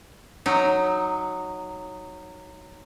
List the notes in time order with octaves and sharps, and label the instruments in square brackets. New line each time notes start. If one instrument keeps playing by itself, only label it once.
[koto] F#3 D#4